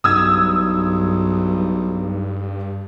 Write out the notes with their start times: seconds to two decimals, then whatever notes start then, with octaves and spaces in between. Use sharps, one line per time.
0.04 B1 G2 D#6 E6 G#6